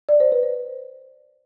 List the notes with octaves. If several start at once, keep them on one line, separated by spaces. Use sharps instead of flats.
D5
C5
B4
C5